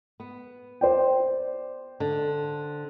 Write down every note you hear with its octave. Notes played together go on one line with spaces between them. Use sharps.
B3
C5 D5 G5
D3